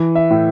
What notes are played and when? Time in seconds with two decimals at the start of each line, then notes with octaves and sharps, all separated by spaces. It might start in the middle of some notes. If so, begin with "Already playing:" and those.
Already playing: E3
0.15 E5
0.31 A2